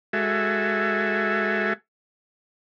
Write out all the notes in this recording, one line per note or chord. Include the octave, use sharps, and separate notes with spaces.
G#3 F#4 A4 E5 G#5